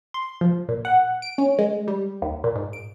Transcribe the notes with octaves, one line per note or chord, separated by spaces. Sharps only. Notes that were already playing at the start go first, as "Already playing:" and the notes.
C6
F3
A#2
F#5
D7
C#4
G#3
G3
D#2
A#2
G#2
D7